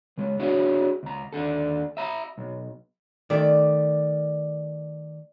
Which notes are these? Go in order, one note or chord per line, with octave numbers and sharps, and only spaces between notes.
C#3 G#3
D4 E4 F#4 G#4 C#5
C#2 A#5
D#2 D4 A4
E5 A#5 B5
B1
D#3 A3 D5